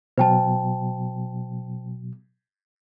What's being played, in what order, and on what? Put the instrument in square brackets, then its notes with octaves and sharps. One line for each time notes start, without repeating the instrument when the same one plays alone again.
[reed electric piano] B2 F#3 [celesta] C5 G5 A5